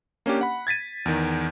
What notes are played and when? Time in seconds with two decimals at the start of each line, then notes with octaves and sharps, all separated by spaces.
0.26 A#3 C#4 D4 G4
0.41 F#5 B5
0.67 G#6 A6 B6 D#7
1.06 E2 D#3